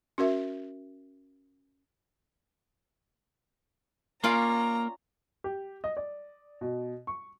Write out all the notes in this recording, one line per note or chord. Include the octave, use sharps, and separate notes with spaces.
C#4 F#4 A#4 E5
A#3 C#4 F4 D5 A#5
G4
D#5
D5
B2
C#6